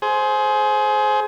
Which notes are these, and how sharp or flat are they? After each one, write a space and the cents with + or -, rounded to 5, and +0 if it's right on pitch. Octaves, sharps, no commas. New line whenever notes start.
G#4 +25 C5 +0